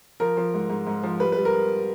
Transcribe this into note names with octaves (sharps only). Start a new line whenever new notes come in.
F3 A#4
F3
G#2
G#2
G#2
F3
G3 B4
G3 B4
A#4